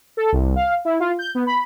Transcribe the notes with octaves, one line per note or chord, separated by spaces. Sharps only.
A4
C2
F5
E4
F4
G6
B3
B5